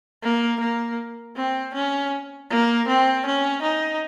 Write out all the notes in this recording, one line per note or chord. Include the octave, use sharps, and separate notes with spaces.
A#3
A#3
C4
C#4
A#3
C4
C#4
D#4